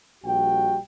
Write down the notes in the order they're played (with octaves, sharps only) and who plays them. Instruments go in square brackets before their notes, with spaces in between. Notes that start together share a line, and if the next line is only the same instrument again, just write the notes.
[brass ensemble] A#1 G3 F#4 G5